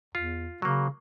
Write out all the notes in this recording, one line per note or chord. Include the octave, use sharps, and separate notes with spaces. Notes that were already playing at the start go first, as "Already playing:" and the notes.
E2 F4
C#3 F#3 A#3